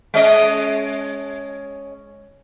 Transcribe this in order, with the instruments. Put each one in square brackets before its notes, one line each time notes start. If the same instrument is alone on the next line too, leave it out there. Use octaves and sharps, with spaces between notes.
[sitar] G#3 C#4 D#5